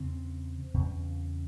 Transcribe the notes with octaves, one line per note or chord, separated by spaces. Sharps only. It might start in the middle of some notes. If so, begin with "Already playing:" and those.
Already playing: E2 C#3 C4
E2 C#3